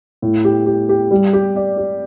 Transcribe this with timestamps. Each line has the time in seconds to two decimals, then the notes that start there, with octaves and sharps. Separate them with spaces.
0.22 A2
0.45 G4
0.66 G4
0.89 G4
1.11 G3
1.33 G4
1.56 D5
1.78 G4